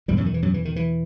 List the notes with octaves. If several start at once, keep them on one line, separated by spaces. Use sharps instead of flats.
E2 G2 B2 G3
F#2 F#3
D#3
E3
F#2 F#3
E3
D#3
E3